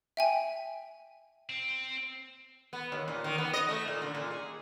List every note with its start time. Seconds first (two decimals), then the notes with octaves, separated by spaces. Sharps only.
0.17 E5 G5 G#5
1.50 C4
2.73 B3
2.92 D#2
3.08 A#2
3.24 D#3
3.38 B3
3.53 D#5
3.69 A3
3.88 A#2
4.02 D3
4.15 A#2
4.30 G#4